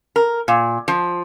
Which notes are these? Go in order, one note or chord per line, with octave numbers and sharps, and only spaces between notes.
A#4
A#2
F3